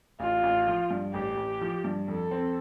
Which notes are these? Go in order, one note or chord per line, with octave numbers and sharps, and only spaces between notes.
A1 F4
A1
F3
G2
A1 G4
A1
F3
G2
F2 A4
C4